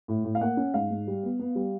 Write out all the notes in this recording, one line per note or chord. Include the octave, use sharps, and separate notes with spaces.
A2
A2
F5
A#3 F#5
C#4
G#2 F5
G#2
G3
B3
B3
G3